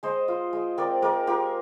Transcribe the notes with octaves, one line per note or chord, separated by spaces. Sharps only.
G#3 C5 D#5
F4
G#3
C4 A#4 D5
G#3 A#4 D5
F4 G4 A#4